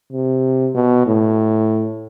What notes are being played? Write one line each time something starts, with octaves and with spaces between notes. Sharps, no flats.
C3
B2
A2